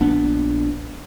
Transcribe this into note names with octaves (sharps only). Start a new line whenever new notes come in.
A#1 B3 D4